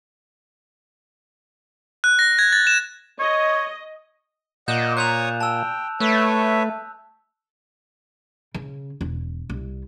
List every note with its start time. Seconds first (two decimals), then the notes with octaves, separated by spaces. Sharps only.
2.04 F#6
2.19 A#6
2.39 G#6
2.53 A6
2.67 E7
3.20 C#5 D#5
4.68 A#2 D#5 F#5 G6 E7
4.97 C#5 C#6 D#6 F#6 G6 F7
5.40 G5 A5 E6
6.00 A3 B4 C#5 E5
8.54 C#3
9.01 E1
9.50 C2